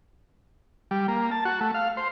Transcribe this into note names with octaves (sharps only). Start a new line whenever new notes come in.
G3
A#3
A5
F#4
A3
F5
C5